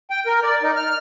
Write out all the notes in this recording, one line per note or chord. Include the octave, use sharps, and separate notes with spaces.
G5
A#4
D5
D#4
F6